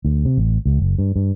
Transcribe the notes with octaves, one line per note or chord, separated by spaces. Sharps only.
D2
C3
A1
C#2
F#1
G2
G2